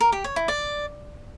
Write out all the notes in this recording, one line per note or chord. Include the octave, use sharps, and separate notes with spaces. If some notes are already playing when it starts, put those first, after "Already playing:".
A#4
G4
C#5
E4
D5